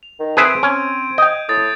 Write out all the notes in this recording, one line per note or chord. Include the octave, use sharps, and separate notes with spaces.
F7
D#3
C4 G#4 B4 E5 G#6 D7 D#7
C#4
D#5 G5 G6
A2 D#6 A6